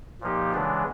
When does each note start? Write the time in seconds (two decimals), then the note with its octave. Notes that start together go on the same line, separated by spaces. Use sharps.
0.21 A#2 F3 A#3 D#4 G4
0.52 C#3 E3 G#3 B3 D4